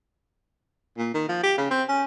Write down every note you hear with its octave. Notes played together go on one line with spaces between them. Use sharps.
A#2
D#3
F3
G4
C#3
C4
C#4